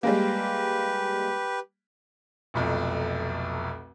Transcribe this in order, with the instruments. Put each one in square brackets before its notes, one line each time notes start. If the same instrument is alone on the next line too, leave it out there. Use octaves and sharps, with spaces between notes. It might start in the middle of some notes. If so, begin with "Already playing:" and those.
[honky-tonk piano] G3 G#3 A#3 [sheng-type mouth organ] G4 B4
[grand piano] F1 B1 F2